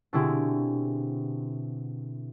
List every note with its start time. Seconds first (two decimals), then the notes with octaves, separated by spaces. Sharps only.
0.13 B2 D3 C4 E4 G4 G#4